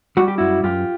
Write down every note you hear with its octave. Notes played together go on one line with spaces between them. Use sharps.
G3 F#4
G4
F#2 E4 F#4
F#2 F4 G4